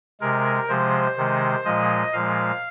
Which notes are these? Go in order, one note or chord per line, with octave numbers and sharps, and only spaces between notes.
C3 G#3 A#4
C3 F3 G#3 C5
C3 D#3 G#3
A#2 F3 G#3 D#5
A#2 F3 G#3 F5